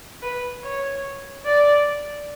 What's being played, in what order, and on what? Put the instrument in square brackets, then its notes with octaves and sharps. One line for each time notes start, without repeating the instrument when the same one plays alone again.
[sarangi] B4
C#5
D5